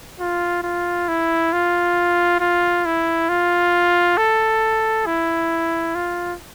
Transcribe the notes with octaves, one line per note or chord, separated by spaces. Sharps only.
F4
F4
E4
F4
F4
E4
F4
A4
E4
F4